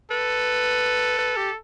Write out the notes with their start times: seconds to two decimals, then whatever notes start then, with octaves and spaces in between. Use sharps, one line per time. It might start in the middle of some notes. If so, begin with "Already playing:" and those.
0.11 A4 B4
1.18 B4
1.36 G4